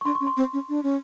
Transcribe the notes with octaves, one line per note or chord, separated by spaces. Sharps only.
C#6
D4 C6
C#6
C#4
C6
C4
C#4
D4
C#4